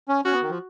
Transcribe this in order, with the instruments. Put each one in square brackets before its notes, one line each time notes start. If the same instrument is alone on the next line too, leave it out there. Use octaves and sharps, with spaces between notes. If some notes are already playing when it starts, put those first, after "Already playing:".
[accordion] C#4
[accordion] C#4 [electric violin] F#4
[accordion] B3
D#3
F3